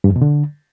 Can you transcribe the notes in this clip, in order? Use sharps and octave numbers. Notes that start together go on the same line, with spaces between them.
G2
F2
B2
D3